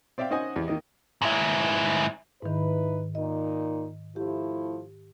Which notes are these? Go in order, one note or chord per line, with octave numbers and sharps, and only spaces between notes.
C4 D5 E5 F5 G5
C#4 D#4 C5 D#5 F#5 G#5
E2 G4
D#3 A#3 D#5
G#2 E4
G#2 D#3 D#4 E4 B4
A#2 D#3 D#4 D#5
F3 A3 E4 G4